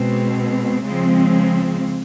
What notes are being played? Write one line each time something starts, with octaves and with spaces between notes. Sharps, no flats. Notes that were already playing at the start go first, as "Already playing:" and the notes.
Already playing: B2 G#3 C4
C#3 F3 G#3 C4